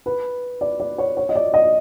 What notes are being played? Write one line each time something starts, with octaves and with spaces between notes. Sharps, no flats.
B4
D5
D5
C#5
C#5
D#5
D5
D#5